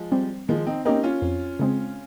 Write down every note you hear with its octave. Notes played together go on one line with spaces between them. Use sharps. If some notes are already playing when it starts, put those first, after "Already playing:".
Already playing: F3 G#3
G3 C4
D#3 F3 G#3
C4 D#4
A#3 C4 C#4 D#4 G4 A#4
C#4 F4
F2
C#3 G#3 C4